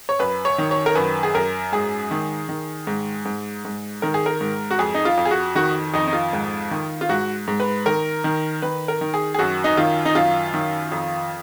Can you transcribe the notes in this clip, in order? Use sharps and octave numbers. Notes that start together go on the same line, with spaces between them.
C#5
F#2 B4
C#5
D#3
C#5
A#4
F#2 B4
G#4
F#2 A#4
G#2 G#4
D#3
D#3
G#2
G#2
G#2
D#3 A#4
G#4
A#4
G#2
F#4
F2 G#4
D#4
F4
F2
G#4
F#4
D#3 F#4
F2 D#4
D#4
F4
G#2
D#3
F4
G#2 F#4
G#2
B4
D#3 A#4
D#3
D#3 B4
A#4
D#3
G#4
G#4
F#2 F#4
D#4
D#3 F4
D#4
F#2 F4
D#3
F2